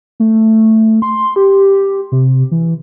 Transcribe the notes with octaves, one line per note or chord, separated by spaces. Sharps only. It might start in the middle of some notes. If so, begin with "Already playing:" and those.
A3
C6
G4
C3
E3